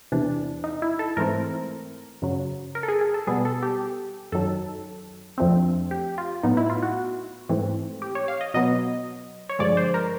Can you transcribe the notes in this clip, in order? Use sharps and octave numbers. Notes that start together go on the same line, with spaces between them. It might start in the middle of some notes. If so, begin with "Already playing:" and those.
E2 C3 E3 D4
D#4
E4
A4
G#2 E3 A3 C4 A#4
F#2 C#3 F#3
A#4
A4
G#4
G#4
A4
B2 G3 B3 G#4
A4
G4
F#2 D#3 F#3 A4
F2 D3 F3 A3 C4
G4
F4
A2 F#3 B3 D#4
E4
F4
F#4
G#2 E3 A3 C4
G4
C#5
F5
D#5
B2 F#3 B3 D#5
C#5
G2 D3 F3 G#3 D5
C5
A#4